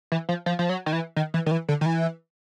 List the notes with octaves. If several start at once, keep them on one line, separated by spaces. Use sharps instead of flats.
E3
F3
F3
F3
F#3
D#3
E3
D#3
E3
D#3
E3
D3
D#3
E3